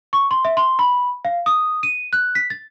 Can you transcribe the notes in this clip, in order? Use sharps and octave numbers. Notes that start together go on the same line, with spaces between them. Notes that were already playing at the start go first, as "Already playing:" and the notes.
C#6
C6
E5
C6
B5
F5
D#6
D#7
F#6
B6
A6